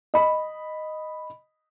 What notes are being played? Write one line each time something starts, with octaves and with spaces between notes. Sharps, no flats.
D#5 B5